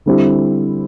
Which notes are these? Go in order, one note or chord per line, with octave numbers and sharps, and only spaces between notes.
D3 G3 C4 E4 G4